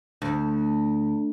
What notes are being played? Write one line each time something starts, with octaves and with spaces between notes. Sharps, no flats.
D2